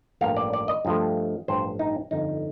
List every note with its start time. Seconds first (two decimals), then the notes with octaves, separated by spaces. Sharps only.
0.21 A1 G2 F3 A#3 F5
0.37 D5
0.53 D5
0.68 D#5
0.85 G2 F3 A3
1.48 A1 G2 F3 C5
1.79 D#4
2.11 G1 F2 D3 D#4